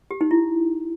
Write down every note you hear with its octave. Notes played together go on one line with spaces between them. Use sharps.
G4
D#4
E4